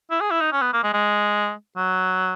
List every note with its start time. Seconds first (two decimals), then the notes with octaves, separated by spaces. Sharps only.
0.11 E4
0.21 G#4
0.31 E4
0.41 D#4
0.52 C#4
0.62 B3
0.73 A#3
0.83 G#3
0.94 G#3
1.77 F#3